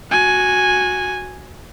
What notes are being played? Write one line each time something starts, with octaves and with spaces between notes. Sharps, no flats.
F#4 G#5